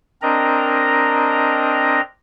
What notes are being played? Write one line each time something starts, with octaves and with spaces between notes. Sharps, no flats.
C4 D4 A#4 D#5 A#5